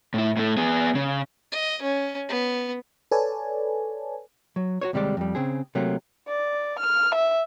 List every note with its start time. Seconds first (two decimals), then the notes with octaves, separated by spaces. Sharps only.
0.14 A2 E4
0.37 A2 A3
0.57 B3 G#4
0.95 C#3
1.52 D#5
1.82 C#4
2.29 B3
3.11 A4 B4 C#5 D5 G#5 A5
4.56 F#3
4.81 F#4 C5 C#5
4.93 D#2 C3 G3 G#3 D5
5.17 F2 G3
5.35 C#3 C4 G#4
5.75 C3 F#3 A3 A#3
6.28 D5
6.80 F6
7.15 E5